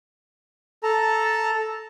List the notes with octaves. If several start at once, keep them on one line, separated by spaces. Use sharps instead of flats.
A4 A5 A#5